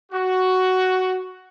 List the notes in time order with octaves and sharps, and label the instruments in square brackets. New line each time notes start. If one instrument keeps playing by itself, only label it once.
[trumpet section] F#4